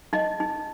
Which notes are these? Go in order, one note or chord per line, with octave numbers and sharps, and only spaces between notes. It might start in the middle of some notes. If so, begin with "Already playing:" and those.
D#4 D#5
D#4